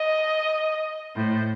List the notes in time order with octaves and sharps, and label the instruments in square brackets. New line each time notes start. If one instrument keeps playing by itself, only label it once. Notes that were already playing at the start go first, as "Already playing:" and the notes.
Already playing: [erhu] D#5
[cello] A2 [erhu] C5